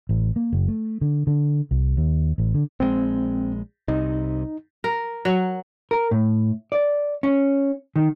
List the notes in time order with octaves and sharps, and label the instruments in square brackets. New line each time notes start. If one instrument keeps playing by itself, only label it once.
[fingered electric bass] A1
A#3
F#1
A3
D3
D3
C2
D#2
A1
D3
[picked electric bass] A#1 G#3 [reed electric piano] C4
[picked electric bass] C2 C3 [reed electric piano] D#4
[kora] A#4
F#3
[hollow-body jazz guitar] A#4
A2
D5
C#4
D#3